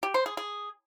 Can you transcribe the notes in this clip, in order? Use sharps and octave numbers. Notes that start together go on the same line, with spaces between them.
G4
C5
G#4
G#4